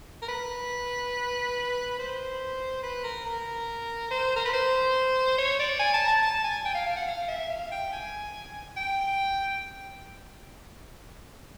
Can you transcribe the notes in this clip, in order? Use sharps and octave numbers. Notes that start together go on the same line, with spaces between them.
A#4
B4
C5
B4
A#4
A#4
C5
A#4
B4
C5
C#5
D5
G#5
A5
A#5
A5
A5
G#5
G5
F5
F5
F#5
F5
E5
F5
G5
G#5
G5